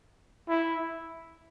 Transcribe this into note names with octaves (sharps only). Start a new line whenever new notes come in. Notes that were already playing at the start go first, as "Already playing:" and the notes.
E4